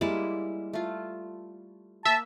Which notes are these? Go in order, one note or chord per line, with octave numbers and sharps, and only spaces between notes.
G3 G#3 A#3 E4 D5
A3 F4
A#3 E5 A5 E6